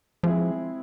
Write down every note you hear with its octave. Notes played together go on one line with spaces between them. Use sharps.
F3 G#3 C4 E4 G#4